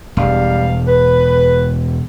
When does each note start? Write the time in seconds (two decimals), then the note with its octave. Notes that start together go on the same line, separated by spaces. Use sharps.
0.17 E1 G3 F5
0.87 B4